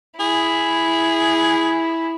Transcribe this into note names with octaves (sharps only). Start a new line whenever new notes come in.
E4 G#4